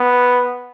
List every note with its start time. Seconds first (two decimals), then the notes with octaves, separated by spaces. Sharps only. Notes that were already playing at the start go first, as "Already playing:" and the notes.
Already playing: B3